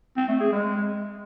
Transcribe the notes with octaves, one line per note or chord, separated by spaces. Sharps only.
C4
A3
G#4
G#3